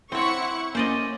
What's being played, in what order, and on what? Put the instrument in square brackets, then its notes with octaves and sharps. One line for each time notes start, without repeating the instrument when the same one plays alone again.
[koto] C4 C#5 [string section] E4 F#5 C#6 [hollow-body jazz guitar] C5
[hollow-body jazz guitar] A#3 [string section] C#4 [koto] C5 D5 D#5